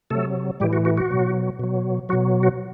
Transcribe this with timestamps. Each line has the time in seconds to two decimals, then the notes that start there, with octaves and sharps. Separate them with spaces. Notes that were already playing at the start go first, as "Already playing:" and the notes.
0.10 C3 F#3 A3 A4
0.60 A2 E3 G3 G4
0.73 F#4
0.85 F#4
0.97 F#4
1.10 B2 F#3
1.59 B2 F#3
2.09 F#3 F#4
2.13 B2
2.43 F#4